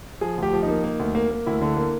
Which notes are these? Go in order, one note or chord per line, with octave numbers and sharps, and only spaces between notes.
F3 G#4
D2 G4
F3
D#4
A#3
A#3
D2
A#3
A#3
D2 E4
D3
A#3